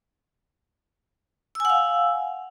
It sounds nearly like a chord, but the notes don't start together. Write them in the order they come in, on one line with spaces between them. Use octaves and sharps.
E6 G#5 F#5 F5